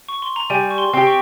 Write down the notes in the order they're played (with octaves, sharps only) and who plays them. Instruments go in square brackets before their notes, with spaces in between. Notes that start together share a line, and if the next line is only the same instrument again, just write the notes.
[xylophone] C#6
C6
A#5
[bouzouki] G3 [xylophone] G#5
[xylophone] C#6
C6
[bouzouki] C4 G4 [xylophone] C6
[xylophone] C#6